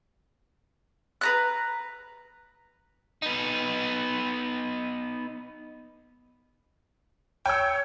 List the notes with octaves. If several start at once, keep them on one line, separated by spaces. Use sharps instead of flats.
B4 A#5 F#6
B3 D#4
C#5 G5 E6